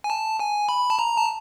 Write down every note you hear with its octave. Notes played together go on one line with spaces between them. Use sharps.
G#5
A5
G#5
B5
A5
A#5
A5